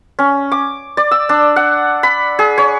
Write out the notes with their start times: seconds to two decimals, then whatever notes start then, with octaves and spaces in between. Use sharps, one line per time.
0.19 C#4
0.52 D6
0.97 D5
1.11 E6
1.29 D4
1.56 F#5
2.03 B5
2.39 G#4
2.58 C#5